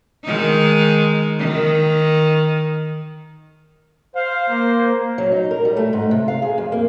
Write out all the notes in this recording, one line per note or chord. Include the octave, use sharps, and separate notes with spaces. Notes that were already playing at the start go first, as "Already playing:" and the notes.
D#3 G#3 D#4
D#3
C5 F5
A#3
F#3
D#4
A#4
G3
A3
G#2
C3
F5
G#4
F2
A#3